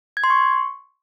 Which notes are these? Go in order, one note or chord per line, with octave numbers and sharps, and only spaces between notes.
G#6
C6
C#6